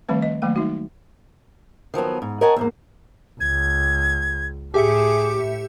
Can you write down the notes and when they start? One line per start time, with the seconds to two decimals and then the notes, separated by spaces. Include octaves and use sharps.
0.09 D#3 F3 G3 A3 C4 B4
0.22 D#5
0.42 D#3 F#3 A3 A#3 G5
0.56 G3 D#4 F#4
1.94 D#3 F3 F#3 B3
2.22 G#2
2.41 A#4 C#5 D#5 F#5 G#5 A5
2.56 E2 G#2 A#3
3.40 C#2 G#6
4.74 A2 G4 G#4 E5 D6 C#7